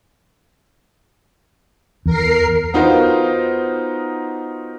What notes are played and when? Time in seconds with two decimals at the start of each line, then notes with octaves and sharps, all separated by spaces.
2.06 E2 A#4 C7
2.74 B3 D#4 F4 F#4 A#4 C5